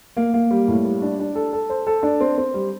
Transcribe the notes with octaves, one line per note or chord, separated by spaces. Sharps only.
A#3
A#3
G3
A2
G3
D4
D4
A4
A4
C5
A4
D4
C4
C4
G3